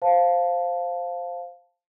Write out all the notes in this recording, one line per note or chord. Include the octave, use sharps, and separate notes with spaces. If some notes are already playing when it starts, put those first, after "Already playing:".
C5 F5 A5